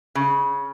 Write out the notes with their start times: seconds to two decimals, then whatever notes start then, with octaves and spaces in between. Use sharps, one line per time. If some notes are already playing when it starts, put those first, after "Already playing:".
0.15 C#3